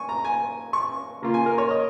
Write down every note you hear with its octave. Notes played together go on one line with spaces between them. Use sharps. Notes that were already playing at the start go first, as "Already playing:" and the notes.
Already playing: G#5 C#6
A#5
G#5
C#6
C#3 A#3 F4
G#5
A#4
C#5
D#5